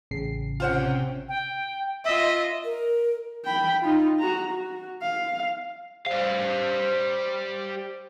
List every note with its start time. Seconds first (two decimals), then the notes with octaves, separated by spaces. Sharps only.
0.11 A1 C#3 C7
0.60 C3 C#4 F4 C5 F#5 G5
1.29 G5
2.05 F4 D#5 E5
2.65 A#4
3.45 G5 B5
3.81 D#4 F4
4.19 F#4 A#5
4.51 F#4
5.02 F5
6.07 G3 G4 C5 F5